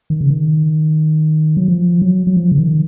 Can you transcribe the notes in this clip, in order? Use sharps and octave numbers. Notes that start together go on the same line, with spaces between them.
D#3
C#3
D#3
F#3
F3
F#3
F#3
F3
C#3
D#3